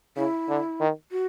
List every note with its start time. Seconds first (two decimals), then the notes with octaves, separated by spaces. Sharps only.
0.16 C#3 E4
0.49 D3
0.81 D#3
1.12 F#4